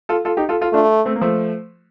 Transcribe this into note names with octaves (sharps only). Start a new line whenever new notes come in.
F4 A4
F4 A4
D#4 G4
F4 A4
F4 A4
A3 D4 F4
A3 C4
A#3
F3 A3